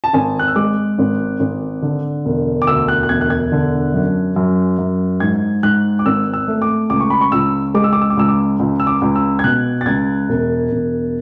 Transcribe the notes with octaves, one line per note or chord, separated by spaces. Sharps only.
A5
G#1 G#5
F#6
E6
G#3 D6
G#1
G#1
D3
E1
D6
D2 E6
F#6
F#6
E1 G#6
F#6
G#6
D3
F#2
F#2
F#2
G#2 G#6
G#2 F#6
D6
G#1 E6
E6
A3
D6
C#2 D6
C#6
B5
C#6
C#2 E6
G#3 D6
E6
D6
E6
D6
C#2 E6
D6
C#2
E6
D6
C#2
E6
G#6
B2 F#6
A6
C#2 G#6
E1
E1